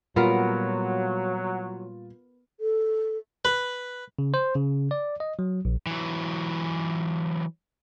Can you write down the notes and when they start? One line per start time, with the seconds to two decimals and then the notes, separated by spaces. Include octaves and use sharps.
0.16 A#2 F#3 G3 B3 F4 A#4 F5
2.60 A4
3.45 B4
4.19 C#3
4.34 C5
4.55 C#3
4.91 D5
5.20 D#5
5.39 F#3
5.65 A#1
5.87 E3 F#3